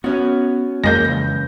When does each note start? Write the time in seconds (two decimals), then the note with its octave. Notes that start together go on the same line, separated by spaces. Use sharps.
0.04 B3 C#4 F#4
0.84 F2 E3 G#3 A#3 G6 A#6
1.05 C#2